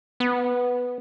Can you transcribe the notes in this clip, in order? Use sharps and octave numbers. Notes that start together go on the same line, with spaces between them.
B3